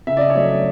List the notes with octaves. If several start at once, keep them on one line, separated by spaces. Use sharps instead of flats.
C#3 E5
D5
D#5
C#5
F#3 A3 D5